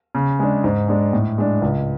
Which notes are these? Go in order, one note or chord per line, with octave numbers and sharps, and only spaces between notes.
C#3
G#3 D4
G#2
G#3 D4
A2
G#3 D4
C#2